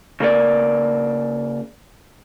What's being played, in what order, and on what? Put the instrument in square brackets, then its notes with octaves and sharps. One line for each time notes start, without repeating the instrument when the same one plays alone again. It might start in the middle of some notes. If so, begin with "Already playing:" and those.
[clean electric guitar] C#3 A#3 A#4 D5